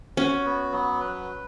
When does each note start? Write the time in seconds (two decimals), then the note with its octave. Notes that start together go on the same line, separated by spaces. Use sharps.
0.17 C#4 F#4
0.46 B3
0.72 F#3
1.00 B4